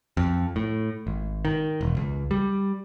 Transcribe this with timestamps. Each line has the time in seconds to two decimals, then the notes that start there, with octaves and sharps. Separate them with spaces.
0.17 F2
0.56 A2
1.07 G#1
1.45 D#3
1.81 E1
1.97 C#2
2.31 G3